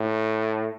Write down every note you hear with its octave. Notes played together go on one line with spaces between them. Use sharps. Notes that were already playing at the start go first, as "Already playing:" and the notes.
Already playing: A2